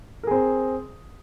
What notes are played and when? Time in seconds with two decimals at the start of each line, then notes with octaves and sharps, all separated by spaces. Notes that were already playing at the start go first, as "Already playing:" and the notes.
0.23 A#4
0.27 G#4
0.31 C4